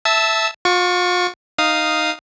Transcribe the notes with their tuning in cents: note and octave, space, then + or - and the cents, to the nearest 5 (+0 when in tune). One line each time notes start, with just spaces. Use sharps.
E5 +0 A5 +0 E6 -20
F4 +40 C#6 +15
D#4 -5 F5 +0 D#6 +0